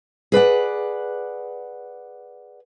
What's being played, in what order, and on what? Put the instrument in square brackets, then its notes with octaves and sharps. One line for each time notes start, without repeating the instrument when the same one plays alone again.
[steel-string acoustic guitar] G#4 B4 D5 F#5